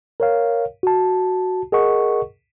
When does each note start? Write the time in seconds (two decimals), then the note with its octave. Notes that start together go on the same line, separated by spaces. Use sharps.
0.20 A#4 C#5 F5
0.83 F#4 A5
1.72 G#4 A#4 D#5 F#5 C#6